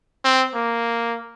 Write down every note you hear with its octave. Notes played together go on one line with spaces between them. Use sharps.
C4
A#3